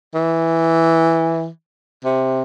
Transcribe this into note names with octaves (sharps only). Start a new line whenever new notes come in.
E3
C3